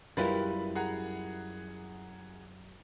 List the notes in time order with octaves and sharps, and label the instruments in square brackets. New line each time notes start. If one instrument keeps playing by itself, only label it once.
[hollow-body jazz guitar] F#2 G3 [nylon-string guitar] E4 F4 A#4 [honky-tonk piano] B4 B5 A6
[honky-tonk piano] G#4 F#5 A#5